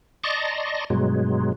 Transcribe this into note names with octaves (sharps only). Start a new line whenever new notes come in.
D5 D#5 A5 A#5 C6 C#6
G2 B2 F#3 G#3